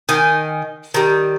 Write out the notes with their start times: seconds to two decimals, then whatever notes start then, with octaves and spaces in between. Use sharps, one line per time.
0.09 D#3 G#5
0.94 D#3 G3